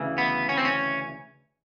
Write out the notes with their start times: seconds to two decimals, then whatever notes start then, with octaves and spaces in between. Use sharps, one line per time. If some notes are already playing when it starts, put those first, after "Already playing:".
Already playing: D2 C#3 E3
0.18 B3
0.49 C#4
0.57 C4
0.65 C#4